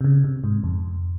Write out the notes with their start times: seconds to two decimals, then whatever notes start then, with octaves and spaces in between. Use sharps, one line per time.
0.01 C3
0.04 C#3
0.24 C3
0.44 G#2
0.64 F2